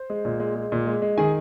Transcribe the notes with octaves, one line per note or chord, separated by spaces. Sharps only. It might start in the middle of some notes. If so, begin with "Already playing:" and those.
Already playing: C5
G#3
A#2
G#3
G#3
A#2
G#3
G#3
D#3 G#4 G#5